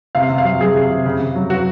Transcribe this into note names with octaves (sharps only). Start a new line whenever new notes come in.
C3 F5
C3
F5
F#3
F#3 G#4
C3
C3
C#3
C#3
F#3
F#3 F#4